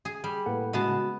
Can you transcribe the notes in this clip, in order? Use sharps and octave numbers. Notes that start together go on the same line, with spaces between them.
G#4
G3 G#4
A2 A#3 A4 B4 F#5
C#3 G#3 B3 F#4 A5